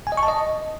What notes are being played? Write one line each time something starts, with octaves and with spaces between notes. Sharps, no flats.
G#5
D#5
C#6
A5
D#5